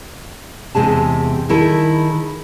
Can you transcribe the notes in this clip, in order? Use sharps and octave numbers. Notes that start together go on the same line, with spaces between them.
E2 C3 G#3 G#4 A5
D#3 E4 G#4 A4